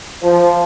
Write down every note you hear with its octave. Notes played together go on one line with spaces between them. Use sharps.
F3